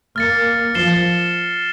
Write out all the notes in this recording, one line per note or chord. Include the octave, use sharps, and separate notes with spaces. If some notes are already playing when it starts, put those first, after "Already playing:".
A#3 F6 A6 C#7
F3 A6 C7 E7 G7